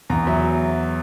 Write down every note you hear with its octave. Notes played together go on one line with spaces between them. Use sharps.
E2 A#5
F#3 E5